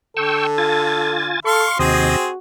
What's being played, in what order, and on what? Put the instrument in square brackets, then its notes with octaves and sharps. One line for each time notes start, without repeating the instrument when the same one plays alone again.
[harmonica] D3 [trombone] A4 [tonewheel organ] G5 C#6 E6
[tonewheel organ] F4 G#5 A6
[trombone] A4 [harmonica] F5 C6 [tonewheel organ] C#6
[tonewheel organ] D#2 C3 D#5 [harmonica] C4 G#4 C5 [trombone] F#4